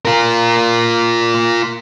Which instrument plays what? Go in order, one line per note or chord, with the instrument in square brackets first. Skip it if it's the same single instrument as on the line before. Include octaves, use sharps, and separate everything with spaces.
[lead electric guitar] F4 A#4